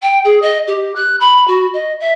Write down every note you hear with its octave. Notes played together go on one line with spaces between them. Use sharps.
G5
G#4
D#5
G4
F#6
B5
F#4
D#5
E5